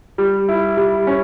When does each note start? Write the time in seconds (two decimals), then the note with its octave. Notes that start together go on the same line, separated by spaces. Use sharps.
0.18 G3
0.49 E4
0.77 G3
1.07 C#4